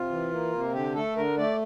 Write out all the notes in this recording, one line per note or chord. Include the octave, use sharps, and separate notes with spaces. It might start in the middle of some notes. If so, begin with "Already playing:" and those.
Already playing: C3 F4
E3
A#3
C3
D3 G4
A3 A4
D3 A#4
A3 D5